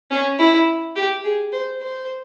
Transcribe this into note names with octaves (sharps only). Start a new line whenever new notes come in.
C#4
E4
G4
G#4
C5
C5